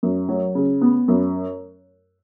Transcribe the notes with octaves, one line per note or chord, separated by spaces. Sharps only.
F#2
F#3
C#3
B3
F#2